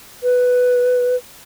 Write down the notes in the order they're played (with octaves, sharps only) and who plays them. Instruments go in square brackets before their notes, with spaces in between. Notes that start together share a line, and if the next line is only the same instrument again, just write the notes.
[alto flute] B4